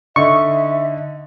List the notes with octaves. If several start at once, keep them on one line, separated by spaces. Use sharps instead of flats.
D3 D#4 E5 C#6